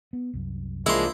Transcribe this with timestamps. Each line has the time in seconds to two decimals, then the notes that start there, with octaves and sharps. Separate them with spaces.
0.13 B3
0.34 C2 F#2
0.86 C2 E3 F3 G#3 A#3 D4 E4 C6